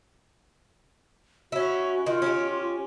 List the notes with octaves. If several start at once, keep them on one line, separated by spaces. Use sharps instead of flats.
C#4 E4 F#4
D#3 F4
C#4 E4 G4